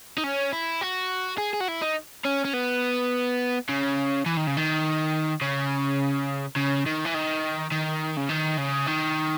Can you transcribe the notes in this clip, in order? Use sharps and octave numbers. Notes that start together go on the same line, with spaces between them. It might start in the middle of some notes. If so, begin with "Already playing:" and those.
D#4
C#4
E4
F#4
G#4
G#4
F#4
E4
D#4
C#4
C#4
B3
C#3
E3
D#3
C#3
D#3
C#3
C#3
D#3
E3
D#3
D#3
C#3
D#3
C#3
D#3